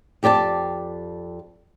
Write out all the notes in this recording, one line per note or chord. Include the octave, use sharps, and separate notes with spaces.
F2 G4 D5 G5 A5